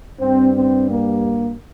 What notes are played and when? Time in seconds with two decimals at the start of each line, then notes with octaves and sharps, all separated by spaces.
0.20 G2 G3 C4
0.55 C4
0.89 A#3